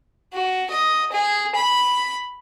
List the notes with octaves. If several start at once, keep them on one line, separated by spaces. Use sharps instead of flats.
F#4
D#5
G#4
B5